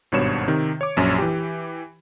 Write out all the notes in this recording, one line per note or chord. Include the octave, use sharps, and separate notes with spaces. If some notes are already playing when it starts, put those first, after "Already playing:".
G#1 G2 B2 C#5 E7
C3 D#3
C#5 D6
A#1 F#2 C#5
E3 G4